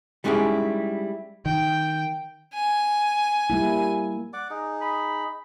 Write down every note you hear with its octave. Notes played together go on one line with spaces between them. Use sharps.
G3 G#3 C#4 D#4 E4 G4
D#3 G5
G#5
G3 A#3 E4
D5 F#5 D6
D#4 G#4
B5